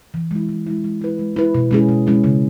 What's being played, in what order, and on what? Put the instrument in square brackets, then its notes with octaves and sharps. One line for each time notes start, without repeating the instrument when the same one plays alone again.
[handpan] E3
G#3 E4
E3
G#3 E4
G#3
E4 B4
G#3
E4 B4
B2
G#3 C#4 E4 G#4
B2
G#3 C#4 E4 G#4
C#3